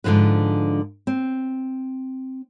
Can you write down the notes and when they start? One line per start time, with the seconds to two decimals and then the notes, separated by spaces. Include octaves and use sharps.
0.04 G#2 D3 E3 F3 B4
1.07 C4